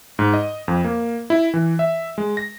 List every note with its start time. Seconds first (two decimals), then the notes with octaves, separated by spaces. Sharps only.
0.19 G#2
0.34 D#5
0.68 F2
0.84 A#3
1.30 E4
1.54 E3
1.79 E5
2.18 G#3
2.37 A#6